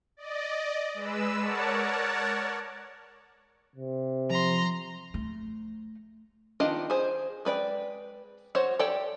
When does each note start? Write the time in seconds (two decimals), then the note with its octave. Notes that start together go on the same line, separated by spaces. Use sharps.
0.17 D5 D#5
0.94 G#3 B4 E6
1.38 A#4 C#5 D5 F#5 A5
3.76 C3
4.30 F3 A#5 C6
5.14 A3
6.60 D#3 B3 D4 F4 D#5
6.90 G#4 C5
7.45 G#3 B4 D5 G5
8.55 F#4 C5 C#5 F#5
8.79 G4 A4 C#5 D5 G5